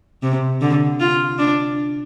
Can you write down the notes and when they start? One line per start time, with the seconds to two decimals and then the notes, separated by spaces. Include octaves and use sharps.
0.23 C3
0.61 D3
1.00 F4
1.38 D4